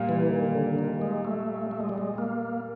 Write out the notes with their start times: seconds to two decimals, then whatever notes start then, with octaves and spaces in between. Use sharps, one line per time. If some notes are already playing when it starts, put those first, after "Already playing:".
Already playing: A#2 G3 A#3
0.09 E3
0.31 D#3
0.55 D3
0.79 D#3
1.01 G#3
1.25 A3
1.71 A3
1.80 G#3
1.89 G3
1.98 G#3
2.18 A#3